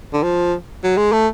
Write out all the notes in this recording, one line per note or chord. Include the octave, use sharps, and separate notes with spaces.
D3
F3
F#3
G#3
A3